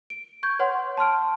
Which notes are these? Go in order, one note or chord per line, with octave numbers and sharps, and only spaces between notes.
D7
C#6 G6 G#6
B4 C#5 F#5 C6
A5 C6 F6 D7